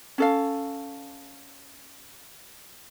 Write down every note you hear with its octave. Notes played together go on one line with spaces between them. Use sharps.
C#4 A4 F5